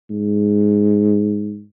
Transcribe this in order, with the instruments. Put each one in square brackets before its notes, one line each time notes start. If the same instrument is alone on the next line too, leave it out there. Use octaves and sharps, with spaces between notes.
[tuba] G#2